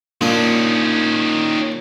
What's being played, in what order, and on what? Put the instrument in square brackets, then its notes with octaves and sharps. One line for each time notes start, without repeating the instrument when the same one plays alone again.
[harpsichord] A#2 D4 [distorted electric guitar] D#3 C#4